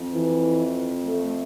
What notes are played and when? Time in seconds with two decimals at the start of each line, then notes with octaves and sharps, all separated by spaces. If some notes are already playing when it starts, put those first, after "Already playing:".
Already playing: F2
0.13 E3
1.04 A3